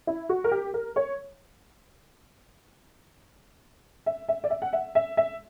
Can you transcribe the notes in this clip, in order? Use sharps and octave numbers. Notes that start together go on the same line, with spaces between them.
E4
F#4
A#4
G4
A#4
C#5
E5
E5
D5
E5
F#5
E5
E5
E5